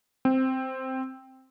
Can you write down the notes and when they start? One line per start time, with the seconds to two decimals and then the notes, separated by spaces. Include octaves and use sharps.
0.25 C4